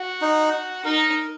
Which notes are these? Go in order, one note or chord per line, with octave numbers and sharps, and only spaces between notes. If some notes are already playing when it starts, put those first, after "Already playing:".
Already playing: F#4
D#4
D#4 A#4